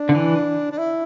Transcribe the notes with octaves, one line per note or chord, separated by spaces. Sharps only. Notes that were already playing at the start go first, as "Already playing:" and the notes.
Already playing: D4
D3
E3
D4
E4